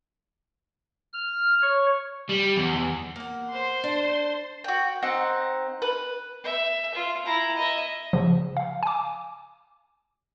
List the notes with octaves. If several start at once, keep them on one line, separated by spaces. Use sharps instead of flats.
F6
C#5
G3
E2
E2
A#3 F#5
C5 C6
D4
F#4 G5
C4 D#4 F#5
B4
E5
F4
E4 A#5
D#5 E5
C#3 F3
F5
G#5 D6